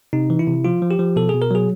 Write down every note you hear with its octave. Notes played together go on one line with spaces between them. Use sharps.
C3 D#4
E3
E4
C3
F3 F4
F3
G4
F3
B2 A4
B2 G#4
A#4
F#3 G#4